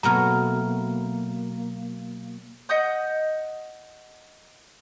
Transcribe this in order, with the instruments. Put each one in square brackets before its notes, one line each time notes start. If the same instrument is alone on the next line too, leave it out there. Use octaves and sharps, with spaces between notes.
[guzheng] B2 F#3 A3 [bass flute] A#3 [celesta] A#5 F6
[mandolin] D#5 F#5 D#6 G6